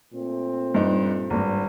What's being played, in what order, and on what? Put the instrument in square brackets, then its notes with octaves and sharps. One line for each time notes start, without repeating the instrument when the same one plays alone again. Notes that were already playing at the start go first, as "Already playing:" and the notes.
[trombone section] A#2 A3 C4
[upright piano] G2 D#4
G#1 G2